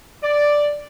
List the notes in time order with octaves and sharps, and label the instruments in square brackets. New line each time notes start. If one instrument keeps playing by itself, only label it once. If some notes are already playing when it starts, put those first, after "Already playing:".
[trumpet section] D5